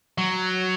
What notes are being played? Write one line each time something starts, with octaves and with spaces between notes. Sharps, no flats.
F#3